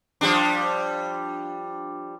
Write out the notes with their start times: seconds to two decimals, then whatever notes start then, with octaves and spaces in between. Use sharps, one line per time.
0.21 F3 G3 D4